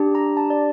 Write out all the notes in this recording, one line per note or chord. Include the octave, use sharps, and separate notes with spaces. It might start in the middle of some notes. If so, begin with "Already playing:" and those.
Already playing: D4 G4
A#5
A5
D5